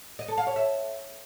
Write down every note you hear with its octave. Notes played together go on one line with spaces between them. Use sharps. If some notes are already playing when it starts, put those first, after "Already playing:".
D#5
A4
F5
C#5
E5